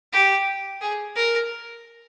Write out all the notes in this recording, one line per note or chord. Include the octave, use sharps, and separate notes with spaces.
G4
G#4
A#4